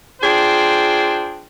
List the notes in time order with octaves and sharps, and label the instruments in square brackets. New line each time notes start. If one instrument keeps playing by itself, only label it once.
[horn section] D4 F4 G#4 C5 G5